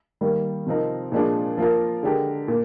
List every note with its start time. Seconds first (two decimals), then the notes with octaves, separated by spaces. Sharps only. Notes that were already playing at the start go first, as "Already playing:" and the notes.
0.21 D#3 G3 A#3
0.67 C3 F3 C4 D#4 A#4
1.12 A#2 F3 G#3 D4
1.57 F3 A#3 F4 A#4
2.03 D3 G#3 D4 G4 A#4
2.48 A#2